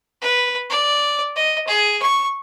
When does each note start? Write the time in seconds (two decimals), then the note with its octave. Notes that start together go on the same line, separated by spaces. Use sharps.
0.22 B4
0.70 D5
1.36 D#5
1.67 G#4
2.02 C#6